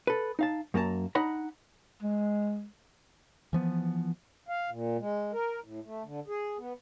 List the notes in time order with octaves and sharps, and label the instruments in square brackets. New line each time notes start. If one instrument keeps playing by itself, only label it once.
[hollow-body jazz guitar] A4 B4
D#4 F5 A5
F#2 A#3 F4 A5 A#5
D4 D#4 F#5 A#5 B5
[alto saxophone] G#3
[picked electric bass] E3 F3 B3
[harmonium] F5
A#2
G#3
A#4
A2
A3
D3
G#4
B3